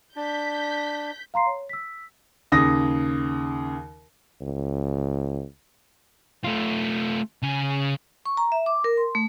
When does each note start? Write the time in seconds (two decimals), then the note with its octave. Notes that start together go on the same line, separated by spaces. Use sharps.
0.16 D4 G6 B6
1.34 F5 A#5 C6 C7
1.47 C#5
1.69 E6 B6
2.52 D#2 C#3 D#6 A#6
4.41 C#2
6.44 A3 F4
7.42 C#3 G#4
8.26 C#6
8.37 A#5
8.52 E5
8.66 D6
8.84 A#4
8.97 C6
9.15 A3